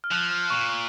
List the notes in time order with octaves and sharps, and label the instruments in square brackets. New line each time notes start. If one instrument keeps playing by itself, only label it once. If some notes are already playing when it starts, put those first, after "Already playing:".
[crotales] F6
[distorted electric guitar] F3 [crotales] F#6
[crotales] F6
[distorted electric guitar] A#2 [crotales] C#6
[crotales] C#6